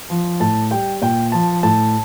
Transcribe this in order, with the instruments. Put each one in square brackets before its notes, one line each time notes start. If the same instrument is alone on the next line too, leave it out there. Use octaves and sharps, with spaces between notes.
[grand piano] F3
A2 A5
G3 G5
A#2 G5
F3 A5
A2 A5